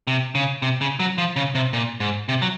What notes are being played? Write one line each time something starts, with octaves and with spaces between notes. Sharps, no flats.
C3
C#3
C3
C#3
F#3
F3
C#3
C3
A#2
G#2
C3
F#3